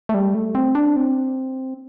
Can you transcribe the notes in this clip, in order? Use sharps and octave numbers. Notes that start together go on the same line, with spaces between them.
A3
G3
A3
C4
D4
C4